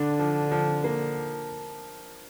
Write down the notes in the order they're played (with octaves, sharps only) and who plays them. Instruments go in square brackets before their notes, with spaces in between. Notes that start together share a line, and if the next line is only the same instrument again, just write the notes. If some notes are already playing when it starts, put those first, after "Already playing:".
Already playing: [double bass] D3 [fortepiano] D4
[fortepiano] F3
F3
A#3